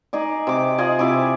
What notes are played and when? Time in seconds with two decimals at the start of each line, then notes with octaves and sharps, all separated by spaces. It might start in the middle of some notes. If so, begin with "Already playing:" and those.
0.13 D#4 G#4 D5
0.47 C3 D6
0.78 F4 G#4 D5 D#5
0.99 C3 E4 G#5 D6